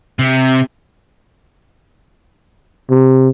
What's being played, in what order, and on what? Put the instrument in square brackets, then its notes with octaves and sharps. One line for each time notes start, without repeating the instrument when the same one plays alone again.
[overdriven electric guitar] C3
[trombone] C3